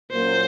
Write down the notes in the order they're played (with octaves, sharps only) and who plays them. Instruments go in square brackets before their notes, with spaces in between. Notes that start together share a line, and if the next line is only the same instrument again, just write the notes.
[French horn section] A#2 F#3 A#3 C#4 [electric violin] C5